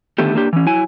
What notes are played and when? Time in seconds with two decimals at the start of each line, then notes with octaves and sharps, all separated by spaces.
0.18 D3 D#3 A3 B3 G4
0.35 A#3 D4 G4
0.53 E3 C#4
0.66 F#3 E4 G#5